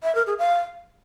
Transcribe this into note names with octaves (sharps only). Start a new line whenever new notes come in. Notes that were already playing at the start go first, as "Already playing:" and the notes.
E5
A#4
G#4
F5